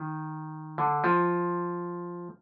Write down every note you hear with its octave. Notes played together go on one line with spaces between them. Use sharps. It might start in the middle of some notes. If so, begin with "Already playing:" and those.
Already playing: D#3
D3
F3